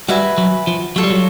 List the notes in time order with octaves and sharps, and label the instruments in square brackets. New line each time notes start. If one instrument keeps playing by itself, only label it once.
[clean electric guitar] G3 [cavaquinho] F#4 B4 E5 G#5
[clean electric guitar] F#3
F3
[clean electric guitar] F#3 [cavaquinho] F4 A4 C#5
[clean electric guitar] G3
F#3